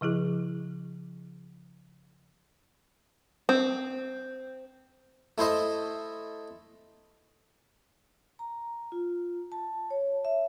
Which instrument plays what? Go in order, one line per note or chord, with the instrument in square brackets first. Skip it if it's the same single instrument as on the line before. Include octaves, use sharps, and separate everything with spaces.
[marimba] C#3 F3 E4 G#4
[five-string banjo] C4
[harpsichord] A3 E4 C5 D#5
[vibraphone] A#5
F4
A5
C#5
E5